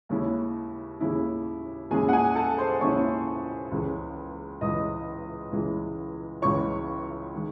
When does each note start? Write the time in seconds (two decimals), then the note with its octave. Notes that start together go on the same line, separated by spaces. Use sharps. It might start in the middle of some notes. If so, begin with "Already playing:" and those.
0.09 D#2 C#3 G#3 C#4 E4
1.01 D#2 C#3 G#3 C#4 E4
1.90 D#2 C#3 G#3 C#4 E4 G#4 G#5
2.09 F#5
2.13 G#4 G#5
2.35 A4 A5
2.58 C5 C6
2.80 D#2 C#3 G#3 C#4 E4 C#5 C#6
3.71 C#2 C#3 E3 G#3
4.61 C#2 C#3 E3 G#3 D#5 D#6
5.52 C#2 C#3 E3 G#3
6.42 C#2 C#3 E3 G#3 C#5 C#6
7.34 D#3 G#3